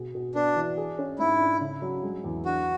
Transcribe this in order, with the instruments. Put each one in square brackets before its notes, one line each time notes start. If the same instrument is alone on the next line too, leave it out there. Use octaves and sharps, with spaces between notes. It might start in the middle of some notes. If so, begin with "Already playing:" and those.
Already playing: [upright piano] B2 G#4
B2
[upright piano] B3 [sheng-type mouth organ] D4
[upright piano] E3
G#4
C#4
[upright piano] G#2 [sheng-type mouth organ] E4
[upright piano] D4
C#3
F#3
G#3
E2
[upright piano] D4 [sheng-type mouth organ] F#4